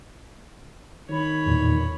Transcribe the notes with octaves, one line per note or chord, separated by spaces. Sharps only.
D#3 C#5 B5
E2 A#2